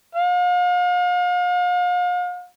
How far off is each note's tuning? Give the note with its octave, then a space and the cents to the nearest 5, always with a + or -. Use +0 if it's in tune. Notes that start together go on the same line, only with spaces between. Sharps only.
F5 +40